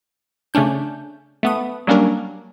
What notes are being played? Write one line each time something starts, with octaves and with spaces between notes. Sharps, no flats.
C#3 A3 C#4 D4 G6
A3 B3 D#6
F#3 G3 A#3 C#4 D4 A#4